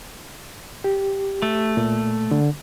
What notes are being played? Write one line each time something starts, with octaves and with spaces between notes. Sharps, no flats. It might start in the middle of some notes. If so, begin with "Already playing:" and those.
G4
A3
A#2
D3